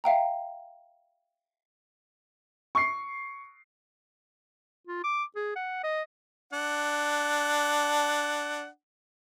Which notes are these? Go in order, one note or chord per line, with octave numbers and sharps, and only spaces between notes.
E5 F5 G5 A#5
C#6 C7
F4
D6
G#4
F#5
D#5
D4 F#5